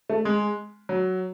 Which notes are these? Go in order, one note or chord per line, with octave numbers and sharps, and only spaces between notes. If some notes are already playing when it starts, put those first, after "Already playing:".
A3
G#3
F#3